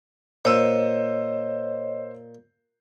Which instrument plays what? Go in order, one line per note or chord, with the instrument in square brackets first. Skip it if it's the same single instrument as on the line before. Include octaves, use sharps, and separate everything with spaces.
[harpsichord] A#2 [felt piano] C5 E6 [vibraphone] C#5 D#5